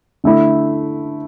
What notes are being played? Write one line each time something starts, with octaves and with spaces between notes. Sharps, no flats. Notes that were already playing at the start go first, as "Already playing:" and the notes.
D3 A3 E4